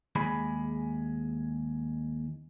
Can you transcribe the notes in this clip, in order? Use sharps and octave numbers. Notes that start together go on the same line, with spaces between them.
D#2 G#3 G#4 B5